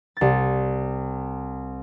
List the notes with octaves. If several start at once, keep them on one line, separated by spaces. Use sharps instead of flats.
C2 A6